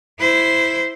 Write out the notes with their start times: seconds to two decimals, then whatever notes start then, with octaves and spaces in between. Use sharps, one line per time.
0.20 E4 C5